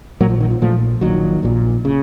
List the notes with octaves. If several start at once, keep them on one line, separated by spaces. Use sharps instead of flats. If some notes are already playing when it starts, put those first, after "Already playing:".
A#1 A#2 F#3 A#3
F3
D#3
F3
A#1 A#2 F3 A3
A#1 A#2 D#3 F#3
A#1 A#2
C#3